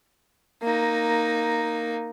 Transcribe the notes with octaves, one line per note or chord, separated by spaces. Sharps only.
A#3 D#4